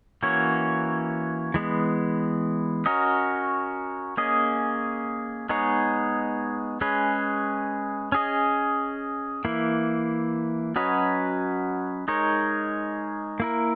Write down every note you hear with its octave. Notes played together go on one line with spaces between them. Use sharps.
E3 A#3 C#4 F#4 C#5
E3 G#3 B3
C#4 F#4 A#4 D#5
A#3 C#4 G#4 D#5
G#3 B3 D#4 G#4 C#5
G#3 C#4 G#4 B4
C#4 G#4 D#5
E3 A#3 E4
F#3 C#4 F#4 B4 D#5
G#3 D#4 A#4 C#5
A#3 E4 A#4